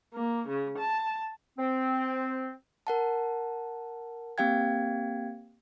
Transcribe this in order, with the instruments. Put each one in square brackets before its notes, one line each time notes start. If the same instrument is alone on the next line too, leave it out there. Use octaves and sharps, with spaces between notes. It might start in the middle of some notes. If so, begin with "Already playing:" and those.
[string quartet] A#3
C#3
A5
[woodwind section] C4
[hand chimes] A#4 F#5 A5
A#3 C4 G4 F5 G5 G#6